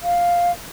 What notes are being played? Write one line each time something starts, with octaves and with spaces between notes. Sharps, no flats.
F5